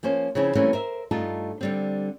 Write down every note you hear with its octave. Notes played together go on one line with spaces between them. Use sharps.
F3 A#3 C#4 C5
C#3 F3 C4 C#4 E4
E3 G3 A3 A#3 C4 C#4
A#4 C5 E5
G2 A3 D#4 F4 A5
D3 G3 C4